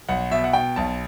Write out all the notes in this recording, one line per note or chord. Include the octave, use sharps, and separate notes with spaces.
B1 F#5
B2 E5
F#5
B2 G5
B1 A5